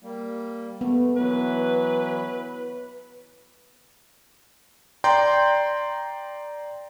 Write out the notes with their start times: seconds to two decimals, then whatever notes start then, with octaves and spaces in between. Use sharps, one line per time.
0.03 G3 A#3
0.81 A3 B3
1.16 E3 F#3 B4
5.04 D5 G5 A#5 C6 G6